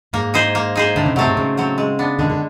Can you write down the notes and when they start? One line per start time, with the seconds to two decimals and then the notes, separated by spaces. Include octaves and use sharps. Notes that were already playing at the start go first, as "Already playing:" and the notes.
0.13 G#2 A#3
0.34 D#4 G#4 C5
0.55 A#3
0.75 D#4 G#4 C5
0.96 A2 D3
1.06 C#3
1.16 C3 F#3 A3 C4
1.27 G#2
1.37 A2 C#3
1.57 F#3 A3 C4
1.78 G#3
1.99 B3 D4
2.19 D3 G#3
2.30 D3